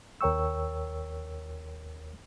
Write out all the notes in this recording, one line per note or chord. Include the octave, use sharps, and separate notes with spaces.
D#2 A#4 C#5 G5 C#6 E6